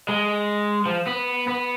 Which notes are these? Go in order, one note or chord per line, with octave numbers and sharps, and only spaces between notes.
G#3
F3
B3
B3